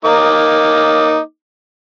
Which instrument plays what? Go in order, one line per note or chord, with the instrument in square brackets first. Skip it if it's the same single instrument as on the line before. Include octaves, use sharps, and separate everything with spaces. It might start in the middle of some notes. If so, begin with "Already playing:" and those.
[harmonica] A#3 D#4 D6